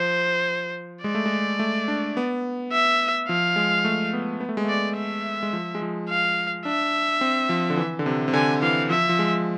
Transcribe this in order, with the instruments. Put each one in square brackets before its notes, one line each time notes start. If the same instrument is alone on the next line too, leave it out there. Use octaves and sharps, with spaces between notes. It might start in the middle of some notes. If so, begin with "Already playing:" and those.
Already playing: [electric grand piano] F3 [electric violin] C5
[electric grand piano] G#3 [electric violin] D5
[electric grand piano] A3
G#3
A3
D4
B3
[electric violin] E5
[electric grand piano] F3 [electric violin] F5
[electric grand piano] G#3
A3
B3
B3
A3
G#3
[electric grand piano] A3 [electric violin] D5
[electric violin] E5
[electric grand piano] G#3
F3
G#3
F3
[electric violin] F5
[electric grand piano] D4 [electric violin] E5
[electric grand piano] C4
F3
D3
E3
D3
C3
C3
[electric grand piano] D3 [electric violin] G#5
[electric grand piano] E3 [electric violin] F5
[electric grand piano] F3 [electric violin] E5
[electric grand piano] F3
G#3